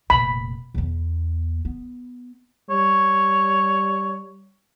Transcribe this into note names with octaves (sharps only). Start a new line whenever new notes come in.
F1 A#2 B5
E2 B3
B3
G3 C#5